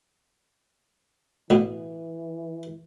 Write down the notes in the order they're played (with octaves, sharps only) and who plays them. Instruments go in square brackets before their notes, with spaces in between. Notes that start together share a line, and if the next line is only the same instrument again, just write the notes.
[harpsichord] A1 B2 [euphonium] E3